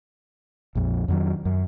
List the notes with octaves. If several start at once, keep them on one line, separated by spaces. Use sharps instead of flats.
A#1 F2
F2 D#3 F#3
F#2